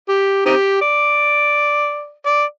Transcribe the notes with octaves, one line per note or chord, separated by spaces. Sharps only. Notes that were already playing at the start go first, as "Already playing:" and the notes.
G4
C4 D#4 G4
D5
D5